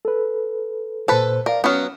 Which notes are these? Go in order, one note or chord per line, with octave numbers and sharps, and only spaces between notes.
A4 B4
A#2 A4 B4 C5
A#4 D5 F5
F#3 B3 C#4 F6